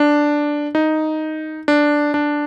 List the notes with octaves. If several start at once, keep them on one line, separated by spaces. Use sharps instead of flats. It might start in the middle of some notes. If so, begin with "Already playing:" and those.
Already playing: D4
D#4
D4
D4